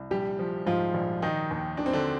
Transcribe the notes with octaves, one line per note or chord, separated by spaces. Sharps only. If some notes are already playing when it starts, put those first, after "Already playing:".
Already playing: C2
A#1 G3 G4
F3
G#2 F3 F4
A#1
D#3 D#4
D#2
D#3 D4
C4
D3 D4